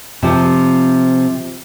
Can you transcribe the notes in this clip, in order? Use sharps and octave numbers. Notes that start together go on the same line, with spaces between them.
C3 F3